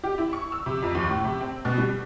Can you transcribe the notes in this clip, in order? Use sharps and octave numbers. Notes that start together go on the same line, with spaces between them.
G4
E4
C#6
E6
C3
F2
D#2
A2
C3
C4
B2
G3